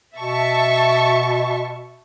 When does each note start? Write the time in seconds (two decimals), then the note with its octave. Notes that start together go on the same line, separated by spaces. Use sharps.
0.17 B2 E5 A5 C#6